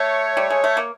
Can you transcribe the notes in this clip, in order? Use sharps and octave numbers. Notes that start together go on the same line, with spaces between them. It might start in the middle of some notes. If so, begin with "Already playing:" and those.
Already playing: A3 C#5
G3
G#3
A3
A#3